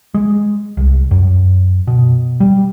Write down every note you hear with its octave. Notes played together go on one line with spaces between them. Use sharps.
G#3
C2
F#2
B2
G3